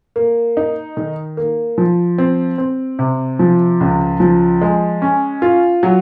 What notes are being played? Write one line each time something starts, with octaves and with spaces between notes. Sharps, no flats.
A#3
D#4
D#3
A#3
F3
C4
C4
C3
F3
C#2
F3
G#3
C#4
F4
F#3